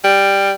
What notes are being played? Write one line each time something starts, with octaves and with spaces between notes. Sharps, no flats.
G3